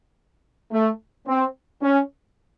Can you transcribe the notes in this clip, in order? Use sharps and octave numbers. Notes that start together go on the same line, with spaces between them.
A3
C4
C#4